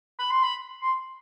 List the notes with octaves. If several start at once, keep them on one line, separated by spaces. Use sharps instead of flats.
B5
C6
B5
C6